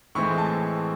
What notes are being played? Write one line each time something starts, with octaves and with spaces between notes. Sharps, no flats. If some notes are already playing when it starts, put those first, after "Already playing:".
A2 E3 G#3 C4 C#6
A5